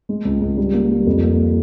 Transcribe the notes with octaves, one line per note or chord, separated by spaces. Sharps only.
G#3
C#2
C#2
G3
A#3
G3
F2
A#3